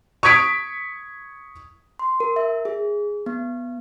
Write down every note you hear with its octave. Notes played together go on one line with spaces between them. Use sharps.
C#6 D#6 G#6 B6 D7
C6
A#4
E5
G#4
B3